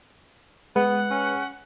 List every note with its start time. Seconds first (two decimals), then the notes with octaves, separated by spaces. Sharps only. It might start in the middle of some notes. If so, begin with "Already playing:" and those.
0.76 G#3 B3 B4 F#5
1.11 C#4